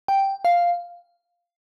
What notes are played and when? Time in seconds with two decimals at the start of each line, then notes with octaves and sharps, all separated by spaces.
0.08 G5
0.45 F5